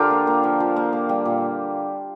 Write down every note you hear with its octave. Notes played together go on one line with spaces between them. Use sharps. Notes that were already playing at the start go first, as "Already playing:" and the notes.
Already playing: D3 D4 F4 G4 A#4 C5 D5
A#3
A#3
F3
F3
A#3
A#3
G3
A#2